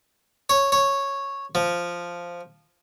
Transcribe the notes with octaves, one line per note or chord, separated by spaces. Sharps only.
C#5
C#5
F3